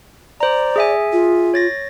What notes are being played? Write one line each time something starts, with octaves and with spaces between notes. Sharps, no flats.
C5 D5 A#5
G#4 E5 G#5
F4
C#5 A6 A#6